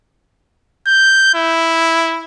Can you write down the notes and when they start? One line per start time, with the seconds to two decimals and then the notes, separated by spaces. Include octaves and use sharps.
0.87 G6
1.34 E4